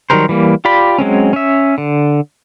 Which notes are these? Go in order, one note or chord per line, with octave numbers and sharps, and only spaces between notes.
D#3 F#3 G3 A#4 C5
E3 G3 A#3
F4 G4 D5 B5
F#3 G#3 C4 C#4
C#4 E5
D3